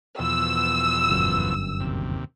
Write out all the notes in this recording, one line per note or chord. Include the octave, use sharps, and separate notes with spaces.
E2 B2 F3 E6
G1 F#2
D#2 C3